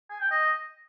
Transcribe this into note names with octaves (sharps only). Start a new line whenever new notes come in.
G#5
G5
D#5